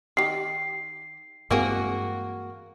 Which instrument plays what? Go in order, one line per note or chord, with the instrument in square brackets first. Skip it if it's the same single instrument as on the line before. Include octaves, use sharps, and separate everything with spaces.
[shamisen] D#3 G4 [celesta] C7
[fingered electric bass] G2 G#3 [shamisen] E3 C4 G#4 [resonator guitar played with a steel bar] A#3 F#4